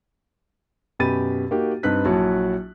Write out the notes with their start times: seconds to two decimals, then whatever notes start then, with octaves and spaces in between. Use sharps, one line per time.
0.99 F#2 B2 G4 B5 A6 D#7
1.51 A#3 D#4 F#4 G4
1.83 G2 C4 D#4 B4 F#6 B6
2.05 A#1 F#3 E4 F#4 A5